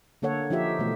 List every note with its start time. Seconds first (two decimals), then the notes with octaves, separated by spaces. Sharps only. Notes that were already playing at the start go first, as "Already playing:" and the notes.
0.22 D3 A#3 A4 C#5 F#5
0.50 F3 D#4 F4 G4 E5
0.79 B2 E3 A3